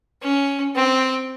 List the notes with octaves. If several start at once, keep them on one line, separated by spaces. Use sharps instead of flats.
C#4
C4